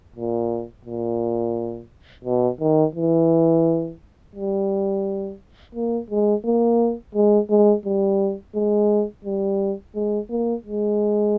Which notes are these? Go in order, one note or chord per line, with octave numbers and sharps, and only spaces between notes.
A#2
A#2
B2
D#3
E3
G3
A#3
G#3
A#3
G#3
G#3
G3
G#3
G3
G#3
A#3
G#3